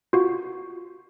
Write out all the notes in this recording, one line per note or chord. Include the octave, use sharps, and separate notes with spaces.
F4 F#4